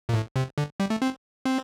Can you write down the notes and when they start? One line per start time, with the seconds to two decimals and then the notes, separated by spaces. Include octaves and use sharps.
0.09 A#2
0.14 A2
0.36 C3
0.58 D3
0.80 G3
0.90 A3
1.02 C4
1.45 C4